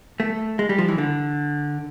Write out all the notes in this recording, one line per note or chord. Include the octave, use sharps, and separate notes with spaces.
A3
G#3
G3
F3
E3
D3